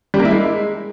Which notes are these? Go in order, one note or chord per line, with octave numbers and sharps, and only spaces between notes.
G3
A#3
E4
G#3